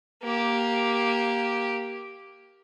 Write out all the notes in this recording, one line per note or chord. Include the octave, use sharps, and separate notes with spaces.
A#3 G4